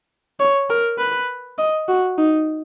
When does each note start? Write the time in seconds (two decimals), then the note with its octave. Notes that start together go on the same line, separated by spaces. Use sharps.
0.40 C#5
0.70 A#4
0.98 B4
1.58 D#5
1.88 F#4
2.18 D#4